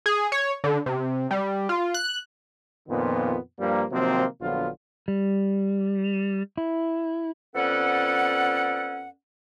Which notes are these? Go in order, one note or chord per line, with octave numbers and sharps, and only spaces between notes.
G#4
C#5
D3
C3
G3
F4
F#6
F2 A#2 D#3 F3 B3
G2 F3 G3 A#3
C3 D#3 F3 F#3 A#3 C4
A#1 D3 F#3 B3 F4
G3
E4
F2 B3 C#4 A4 D5 F#5